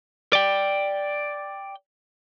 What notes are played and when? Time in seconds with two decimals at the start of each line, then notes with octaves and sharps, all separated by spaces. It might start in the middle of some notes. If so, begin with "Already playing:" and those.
0.33 D5 G5